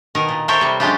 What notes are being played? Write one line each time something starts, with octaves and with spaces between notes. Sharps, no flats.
B2 D#3 A#4
A#2
A4 A#4 C5 C#5 E5 G5
C3 G3
F#3 G#3 C#4 D4 F4 G4